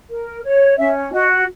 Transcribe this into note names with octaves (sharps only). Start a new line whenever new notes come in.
A#4
C#5
C#4 E5
F#4 D#5